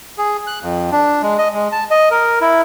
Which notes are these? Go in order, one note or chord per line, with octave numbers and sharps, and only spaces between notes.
G#4
F#6
F2
D4
G#3
D#5
G#3
A5
D#5
A#4
E4